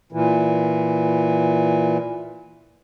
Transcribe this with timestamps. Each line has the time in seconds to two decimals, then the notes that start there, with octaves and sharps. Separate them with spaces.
0.12 A#2 E3